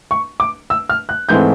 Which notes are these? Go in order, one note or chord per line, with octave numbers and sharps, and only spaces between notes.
C#6
D6
E6
F6
F#6
G#2 E3 A3 C4 G6